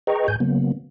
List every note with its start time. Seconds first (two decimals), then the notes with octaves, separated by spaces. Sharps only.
0.07 G#4 B4 D#5 G5 A#5 C#6
0.28 G#2 G#5 G6
0.40 C#3 F#3 A#3 B3